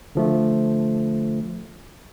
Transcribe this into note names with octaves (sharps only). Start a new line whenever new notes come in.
D3 F3 A3